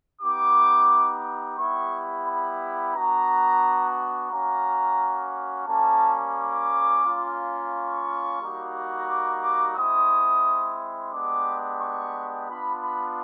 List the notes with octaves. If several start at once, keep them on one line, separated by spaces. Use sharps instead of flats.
B3 D#4 G4 D6
G3 B3 E4 G4 C#6
B5
B3 D4 F#4 A#5
A#3 C#4 F#4 A#5
G3 A#3 C#4 A5
D6
A#3 C#4 F4
C#6
G3 A#3 D#4 F#4
D6
D6
G#3 C4 E4 D#6
G#3 B3 D4 G4 D6
C#6
B3 D4 F4 B5
B5